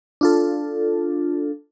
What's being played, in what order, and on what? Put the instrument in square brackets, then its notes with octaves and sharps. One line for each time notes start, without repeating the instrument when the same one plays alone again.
[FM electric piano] D4 F4 A4